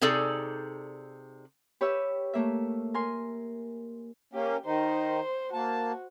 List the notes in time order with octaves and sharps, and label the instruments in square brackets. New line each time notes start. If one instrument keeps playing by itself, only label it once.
[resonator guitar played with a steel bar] C3 D#4 G#4 A4 D5
[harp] G4 B4 C#5 E5 E6
A3 A#3 E5
A#4 G#5 C6
[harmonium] A#3 C#4 [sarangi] G4
[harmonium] D#3 D#4 [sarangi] C5
[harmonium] A#3 A5 [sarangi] F#4